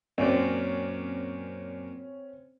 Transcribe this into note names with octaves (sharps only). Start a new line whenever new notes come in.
F#2 A#2 C4 C#4 D5